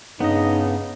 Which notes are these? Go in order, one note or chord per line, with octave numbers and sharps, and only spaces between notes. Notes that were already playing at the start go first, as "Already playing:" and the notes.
G2 C#3 B3 D#4 D#5